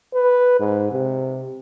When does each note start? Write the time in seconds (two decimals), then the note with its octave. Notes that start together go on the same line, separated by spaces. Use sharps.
0.14 B4
0.60 G#2
0.92 C3